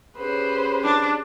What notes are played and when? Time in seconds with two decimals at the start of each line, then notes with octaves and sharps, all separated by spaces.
0.17 C#4 G4 G#4 B4 C5
0.83 D4